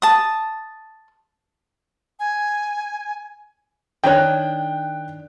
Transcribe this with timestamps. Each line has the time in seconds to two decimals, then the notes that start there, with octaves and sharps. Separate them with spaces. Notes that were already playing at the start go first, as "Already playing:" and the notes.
0.02 A5 D#6
2.20 G#5
4.04 D#3 D4 C#5 G5 F#6